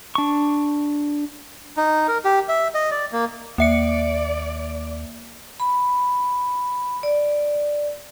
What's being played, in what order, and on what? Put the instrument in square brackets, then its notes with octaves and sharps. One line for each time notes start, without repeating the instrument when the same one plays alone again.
[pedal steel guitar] D4 C#6
[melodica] D#4
A#4
G4
E5
D#5
D5
A#3
[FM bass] D#2 [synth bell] A#3 E5 C#7 [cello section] D5
[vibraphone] B5
D5